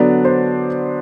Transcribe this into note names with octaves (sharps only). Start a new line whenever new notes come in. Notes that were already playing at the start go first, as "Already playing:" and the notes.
Already playing: D3 F#3 B3 D4 D5
C5